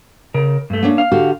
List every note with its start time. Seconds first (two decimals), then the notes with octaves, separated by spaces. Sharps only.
0.34 C#3 A#4
0.70 G2 A3
0.83 A#3 C#4 D4
0.98 F5
1.12 D3 F#4 G4